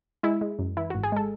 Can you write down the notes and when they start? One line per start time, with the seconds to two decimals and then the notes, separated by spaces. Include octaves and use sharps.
0.23 G#3 E4
0.41 G#3
0.59 F#2
0.77 E3 E4
0.90 G#1 F#4
1.03 G#4
1.12 G#3 A4